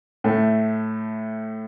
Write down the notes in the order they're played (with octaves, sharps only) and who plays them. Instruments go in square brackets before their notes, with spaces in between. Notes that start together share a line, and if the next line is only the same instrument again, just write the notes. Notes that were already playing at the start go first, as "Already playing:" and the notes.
[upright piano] A2 A3